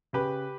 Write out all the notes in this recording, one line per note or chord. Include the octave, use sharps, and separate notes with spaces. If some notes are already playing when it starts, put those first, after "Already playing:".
C#3 G4 B4